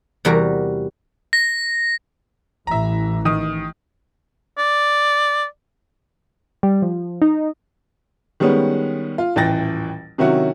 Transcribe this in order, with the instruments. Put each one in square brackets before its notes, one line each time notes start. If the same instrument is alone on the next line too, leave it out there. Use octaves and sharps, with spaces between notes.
[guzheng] E2 C3 G3 F#4 A#4
[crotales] A#6
[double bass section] A1 E3 [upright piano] E5 A#5
[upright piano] D#3 D#6
[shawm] D5
[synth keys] G3
F3
D#4
[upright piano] D#3 G3 G#3 B3 C#4
F4
D#1 A1 E3 G5 A6 A#6
C3 D#3 F#3 C#4 E4 F#4